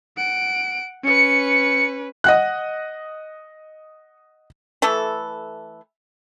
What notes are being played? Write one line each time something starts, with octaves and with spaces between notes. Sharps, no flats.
F#5 D7
C#4 B4 C#7
D#5 F#5 F#6
E3 A3 A4